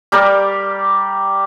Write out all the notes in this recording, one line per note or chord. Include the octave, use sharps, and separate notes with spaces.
G3 G4 A#4 D5